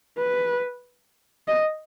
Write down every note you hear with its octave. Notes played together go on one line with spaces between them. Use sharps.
B4
D#5